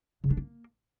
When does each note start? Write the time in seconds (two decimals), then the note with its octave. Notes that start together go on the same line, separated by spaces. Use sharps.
0.24 C#3
0.30 D4
0.37 A#3